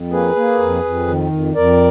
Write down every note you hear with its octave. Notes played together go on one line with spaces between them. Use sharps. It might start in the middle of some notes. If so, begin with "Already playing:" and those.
Already playing: F2
A#3 G#4 B4
A#3
F2
F2
D#3
F2
F2 A#4 D5